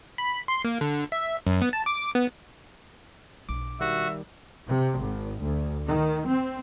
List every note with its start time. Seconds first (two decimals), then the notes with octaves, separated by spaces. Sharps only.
0.18 B5
0.48 C6
0.65 A#3
0.81 D3
1.12 E5
1.47 F#2
1.62 B3
1.73 A5
1.86 D6
2.15 B3
3.49 B1 D4 D6
3.80 D#3 G3 F#4 E5
4.66 C3
4.99 G#1
5.40 D2
5.87 D#3
6.28 C4